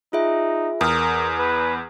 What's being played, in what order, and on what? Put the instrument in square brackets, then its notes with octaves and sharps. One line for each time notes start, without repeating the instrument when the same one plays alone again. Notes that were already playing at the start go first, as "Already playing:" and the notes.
[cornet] D#4 [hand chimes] F4 G#4 E5
[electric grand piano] E2 [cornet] A#4 [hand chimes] D#6 F6
[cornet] B4